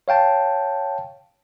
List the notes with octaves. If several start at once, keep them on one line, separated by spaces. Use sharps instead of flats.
C#5 F5 G5 A5